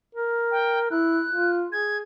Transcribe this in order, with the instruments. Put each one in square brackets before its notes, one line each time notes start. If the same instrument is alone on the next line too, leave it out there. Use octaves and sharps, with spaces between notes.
[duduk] A#4
[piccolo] G5
[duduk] E4 [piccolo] F#6
[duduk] F4
[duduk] G#4 [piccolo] G#6